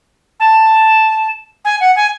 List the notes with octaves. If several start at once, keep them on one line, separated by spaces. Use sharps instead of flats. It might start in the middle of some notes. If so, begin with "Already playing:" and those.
A5
G#5
F#5
G#5